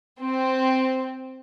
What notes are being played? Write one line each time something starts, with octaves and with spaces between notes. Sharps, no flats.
C4